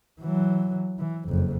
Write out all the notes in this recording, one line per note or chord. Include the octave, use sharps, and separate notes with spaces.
E3 F#3
E3
F#1 F2